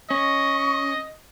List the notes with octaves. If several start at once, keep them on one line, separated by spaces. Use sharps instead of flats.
C#4 D#5 C#6